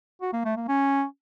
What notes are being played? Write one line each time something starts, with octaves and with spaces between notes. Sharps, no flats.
F#4
A#3
A3
A#3
C#4